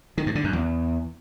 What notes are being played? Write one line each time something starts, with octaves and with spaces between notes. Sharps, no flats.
D#3
G2
D3
F#2
E2